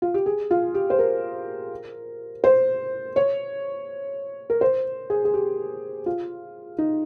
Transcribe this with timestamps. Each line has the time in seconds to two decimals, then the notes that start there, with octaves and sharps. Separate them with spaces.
0.02 F4
0.14 G4
0.26 G#4
0.51 F4
0.74 G4
0.90 C5
0.99 A#4
2.44 C5
3.16 C#5
4.50 A#4
4.61 C5
5.10 G#4
5.25 G#4
5.34 G4
6.06 F4
6.78 D#4